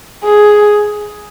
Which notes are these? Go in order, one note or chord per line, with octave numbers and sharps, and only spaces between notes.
G#4